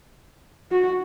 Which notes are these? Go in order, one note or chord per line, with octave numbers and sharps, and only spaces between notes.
F#4